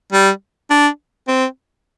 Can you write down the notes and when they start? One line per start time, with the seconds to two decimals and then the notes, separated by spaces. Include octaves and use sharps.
0.13 G3
0.70 D4
1.28 C4